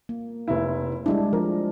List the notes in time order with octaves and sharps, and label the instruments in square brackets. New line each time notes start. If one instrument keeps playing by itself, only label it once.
[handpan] A#3
[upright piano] F1 E4
[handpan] G3 G#3 D4 [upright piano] E4
[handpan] F3 [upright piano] A#4